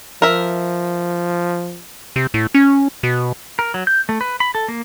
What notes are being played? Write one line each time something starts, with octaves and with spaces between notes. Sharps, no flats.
F3 A#4 E5
C3
A2
C#4
B2
A#4
F#3
G6
A3
B4
B5
A4
A#3